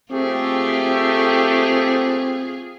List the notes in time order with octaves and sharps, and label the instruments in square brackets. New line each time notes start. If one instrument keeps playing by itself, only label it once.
[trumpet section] A3 G4 [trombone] C4 [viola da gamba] F4 G#4